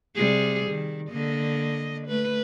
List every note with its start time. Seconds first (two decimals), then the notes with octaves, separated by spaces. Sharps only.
0.15 C3 G3 G#4
0.70 D#3
1.11 D3 A#3 D#5
2.07 A3 B4